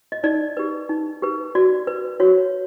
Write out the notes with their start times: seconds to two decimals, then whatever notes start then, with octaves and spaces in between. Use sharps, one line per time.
0.12 D#5
0.24 D#4 D5
0.57 G4 B4
0.89 D#4
1.22 G4 B4
1.55 F#4 D5
1.87 B4
2.20 F#4 C#5